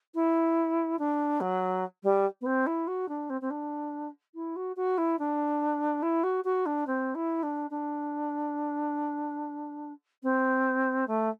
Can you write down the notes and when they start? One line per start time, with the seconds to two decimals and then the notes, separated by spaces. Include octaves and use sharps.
0.14 E4
0.99 D4
1.40 F#3
2.03 G3
2.41 B3
2.46 C4
2.66 E4
2.87 F#4
3.09 D4
3.30 C4
3.41 C4
3.50 D4
4.35 E4
4.56 F#4
4.76 F#4
4.98 E4
5.19 D4
6.02 E4
6.23 F#4
6.44 F#4
6.66 D4
6.87 C4
7.15 E4
7.43 D4
7.70 D4
10.23 C4
11.07 A3